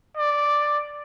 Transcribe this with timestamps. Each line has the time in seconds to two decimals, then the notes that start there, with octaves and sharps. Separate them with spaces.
0.17 D5